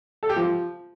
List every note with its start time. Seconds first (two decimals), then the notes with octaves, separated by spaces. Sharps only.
0.23 A4
0.29 G4
0.36 F3